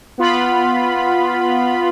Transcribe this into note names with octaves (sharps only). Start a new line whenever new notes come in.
B3 F4 B5